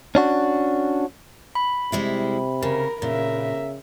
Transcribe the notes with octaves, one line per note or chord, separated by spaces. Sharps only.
C#4 D4 F#4
B5
C3 G3 G#3 E4
C#3 A#4
A#2 C#3 A#4 E5